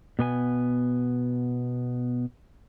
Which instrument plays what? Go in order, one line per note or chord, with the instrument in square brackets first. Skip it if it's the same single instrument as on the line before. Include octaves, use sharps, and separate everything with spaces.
[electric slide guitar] B2 B3 G#5